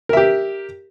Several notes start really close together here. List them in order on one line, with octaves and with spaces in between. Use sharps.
A#4 E5 G4